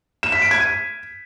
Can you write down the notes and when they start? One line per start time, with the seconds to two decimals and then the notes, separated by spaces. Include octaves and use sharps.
0.23 E7
0.32 B6
0.42 D7
0.51 G#6
0.60 D#7